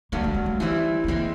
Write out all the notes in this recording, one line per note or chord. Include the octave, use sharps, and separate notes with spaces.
G2 D3 F#3 A#3
A3
G#3
A3
E3 G3 C4 E4
A3
E3 G#3 A#3 C4